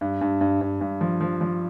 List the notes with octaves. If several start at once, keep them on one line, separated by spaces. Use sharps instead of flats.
G2
G2
G2
G2
G2
F3
F3
F3